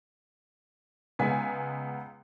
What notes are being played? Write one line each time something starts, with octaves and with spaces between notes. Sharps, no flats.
C#2 G#3 B3 G#5 B6